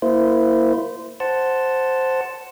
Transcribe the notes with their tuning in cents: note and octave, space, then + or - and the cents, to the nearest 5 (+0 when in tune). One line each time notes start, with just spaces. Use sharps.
A#3 +0 E4 +0 C5 -20
C5 +0 F#5 +0 A5 +0